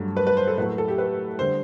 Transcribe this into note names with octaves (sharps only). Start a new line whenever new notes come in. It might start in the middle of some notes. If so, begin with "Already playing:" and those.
Already playing: G2 F#3 A3
B4
B4
C5
A4
A2 F#3 A3 B4
A4
G4
B4
D3 G3 C5